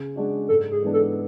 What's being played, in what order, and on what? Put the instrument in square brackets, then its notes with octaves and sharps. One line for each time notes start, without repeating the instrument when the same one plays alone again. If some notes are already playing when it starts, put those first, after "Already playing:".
Already playing: [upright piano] C#3
G#3 D4 F#4
[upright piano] G#2 [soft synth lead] A4
[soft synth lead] G#4
[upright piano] E3 G#3 B3 D4
[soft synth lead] A4